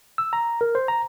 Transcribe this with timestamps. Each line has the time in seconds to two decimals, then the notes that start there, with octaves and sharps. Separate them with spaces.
0.18 E6
0.33 A#5
0.61 A#4
0.75 C5
0.88 A#5